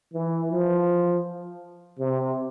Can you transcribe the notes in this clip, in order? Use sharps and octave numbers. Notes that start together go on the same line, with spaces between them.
E3
F3
C3